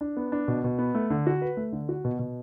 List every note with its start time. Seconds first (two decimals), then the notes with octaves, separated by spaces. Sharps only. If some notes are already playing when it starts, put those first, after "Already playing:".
0.01 D4
0.17 B3
0.32 D4
0.48 B2
0.64 B2
0.79 B3
0.95 A3
1.10 D3
1.27 F#4
1.42 B4
1.57 A3
1.72 D3
1.89 F#4
2.05 B2
2.19 B2